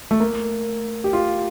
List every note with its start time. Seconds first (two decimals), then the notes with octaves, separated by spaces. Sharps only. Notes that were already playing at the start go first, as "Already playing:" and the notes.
0.11 A3
0.20 A#3
1.04 G4
1.13 F4